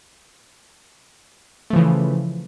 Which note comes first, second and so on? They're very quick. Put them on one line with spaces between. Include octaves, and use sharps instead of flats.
A3 F3 E3 C#3